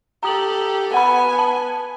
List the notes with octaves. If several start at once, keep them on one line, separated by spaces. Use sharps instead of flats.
G4 A4 A#5 D#6 F#7
B3 F#5 G#5 B5
A5